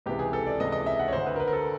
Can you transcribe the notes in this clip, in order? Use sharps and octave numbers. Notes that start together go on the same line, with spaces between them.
C#2 C3 E3 G4
G#4
A4
D5
C#2 C3 E3 D#5
D#5
E5
F#5
C#5
D2 D3 C5
B4
A#4
B4
A#4
A4